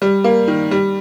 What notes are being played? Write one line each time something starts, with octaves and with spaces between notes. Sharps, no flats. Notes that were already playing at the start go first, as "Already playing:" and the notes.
G3
A#3
D#3
G3